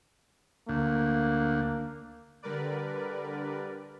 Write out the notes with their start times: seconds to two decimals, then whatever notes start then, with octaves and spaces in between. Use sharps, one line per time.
0.69 D2 A#3
2.42 D3 G3 A#4 B4 D5